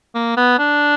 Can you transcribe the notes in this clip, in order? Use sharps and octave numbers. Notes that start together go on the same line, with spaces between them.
A#3
B3
D4